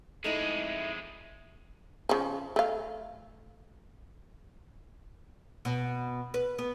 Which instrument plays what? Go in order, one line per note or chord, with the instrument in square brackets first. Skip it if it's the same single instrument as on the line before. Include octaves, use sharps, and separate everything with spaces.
[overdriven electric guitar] F2 G#3 [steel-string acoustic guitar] A3 D#4 E4
[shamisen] C#3 F3
A3 F5
[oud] B2
B4
B3